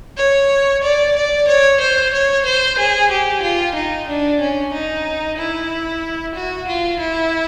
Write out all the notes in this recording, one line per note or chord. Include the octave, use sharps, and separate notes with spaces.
C#5
D5
D5
C#5
C5
C#5
C5
G#4
G4
F4
D#4
D4
C#4
D#4
E4
F#4
F4
E4